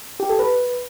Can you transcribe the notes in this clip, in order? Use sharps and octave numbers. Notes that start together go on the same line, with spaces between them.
G4
A4
B4